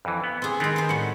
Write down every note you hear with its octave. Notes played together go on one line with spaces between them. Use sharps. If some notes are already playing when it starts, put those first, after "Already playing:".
F2 E3
B3
C4 G#4
D#3 G#3 B3 C4
D#4 C5
A2 G3 F#5